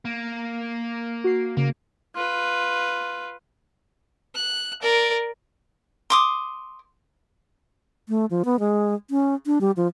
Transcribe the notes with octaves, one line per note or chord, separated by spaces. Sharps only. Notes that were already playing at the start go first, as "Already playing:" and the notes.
A#3
F#4 C7
C#3 A#3
F4 B4
F#6
A#4 D5
C6 D6 D#6
A3
F3
B3
G#3
C#4
D4
G3
F3